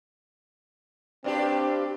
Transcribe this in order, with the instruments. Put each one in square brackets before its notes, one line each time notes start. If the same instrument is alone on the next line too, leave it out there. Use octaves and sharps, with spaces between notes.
[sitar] G2 D4 G4 [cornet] C4